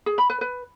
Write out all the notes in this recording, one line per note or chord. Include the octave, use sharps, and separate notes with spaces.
G#4
B5
B4
B4